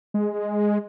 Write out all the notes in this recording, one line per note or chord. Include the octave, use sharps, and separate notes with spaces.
G#3